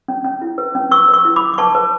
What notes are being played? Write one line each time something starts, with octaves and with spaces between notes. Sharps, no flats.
C#4
C#4
E4
B4
C#4
B4 C#6 E6
B4
C#6 E6
E4
B5 D6
E4
D6
B4 A5 C#6
B4